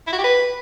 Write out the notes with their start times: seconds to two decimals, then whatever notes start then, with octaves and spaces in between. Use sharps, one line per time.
0.07 E4
0.13 F#4
0.18 G4
0.24 B4